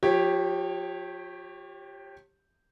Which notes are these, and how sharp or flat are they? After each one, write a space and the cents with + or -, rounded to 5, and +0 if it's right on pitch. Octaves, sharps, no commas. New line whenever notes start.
F3 +35 G4 +0 C#5 -15